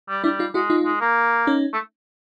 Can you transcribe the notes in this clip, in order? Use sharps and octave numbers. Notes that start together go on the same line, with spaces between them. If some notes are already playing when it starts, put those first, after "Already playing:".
G3
G3 D4 E4
D#4 F4
G#3 E4 F#4
D#4 F4
G#3
A#3
C#4 D#4
A3